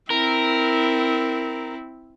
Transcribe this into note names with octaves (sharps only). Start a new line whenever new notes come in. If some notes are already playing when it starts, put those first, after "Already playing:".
C4 E4 A#4